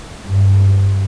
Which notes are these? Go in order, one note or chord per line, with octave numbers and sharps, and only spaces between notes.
G2